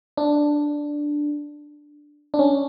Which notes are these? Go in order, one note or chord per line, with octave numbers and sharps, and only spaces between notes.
D4
D4
C#4